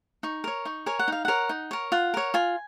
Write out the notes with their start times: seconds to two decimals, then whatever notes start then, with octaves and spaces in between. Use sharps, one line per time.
0.23 D#4 C#6
0.44 A#4 C#5
0.65 D#4 C#6
0.86 A#4 C#5 G#5
0.99 F#5
1.08 D#4 F5
1.25 A#4 C#5 F#5
1.49 D#4
1.71 A#4 C#5
1.92 F4 F#5
2.14 A#4 C#5
2.34 F4 G#5